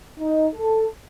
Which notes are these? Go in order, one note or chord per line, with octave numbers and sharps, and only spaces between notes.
D#4
A4